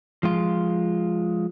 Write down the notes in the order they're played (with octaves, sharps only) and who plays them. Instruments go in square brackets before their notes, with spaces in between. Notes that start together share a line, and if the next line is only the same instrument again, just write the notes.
[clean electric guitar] F3 G#3 F4